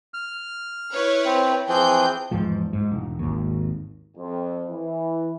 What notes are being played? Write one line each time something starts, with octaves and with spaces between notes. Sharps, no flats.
F6
E4 B4 C#5
C4
E3 F3 C4 G#4 G6
E2 G#2 F3
G#2
E1
G#1 D#2
F2
E3